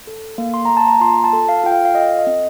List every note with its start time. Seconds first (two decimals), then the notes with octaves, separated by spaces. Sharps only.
0.07 A4
0.38 A#3
0.54 C6
0.65 A#3 A#5
0.77 A5
0.88 A#5
1.01 F4 C6
1.24 A5
1.33 A4
1.49 F5
1.64 F4 G5
1.72 F5
1.85 F5
1.95 A4 D#5
2.19 D#5
2.27 C4